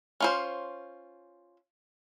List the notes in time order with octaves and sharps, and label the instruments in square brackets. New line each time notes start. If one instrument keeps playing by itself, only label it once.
[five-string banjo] C#4 F4 C5